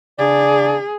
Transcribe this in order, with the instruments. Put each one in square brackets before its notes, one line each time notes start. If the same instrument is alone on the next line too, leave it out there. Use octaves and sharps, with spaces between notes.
[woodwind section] C#3 D4 D5 [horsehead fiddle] G#4